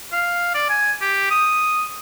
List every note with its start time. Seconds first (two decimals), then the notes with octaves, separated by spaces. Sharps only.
0.12 F5
0.55 D5
0.70 G#5
1.01 G4
1.31 D#6